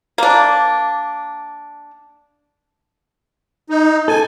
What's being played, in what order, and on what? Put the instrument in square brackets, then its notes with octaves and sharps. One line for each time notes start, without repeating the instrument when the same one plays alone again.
[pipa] A#3 D4
[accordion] D#4
[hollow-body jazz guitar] A4 [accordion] G#5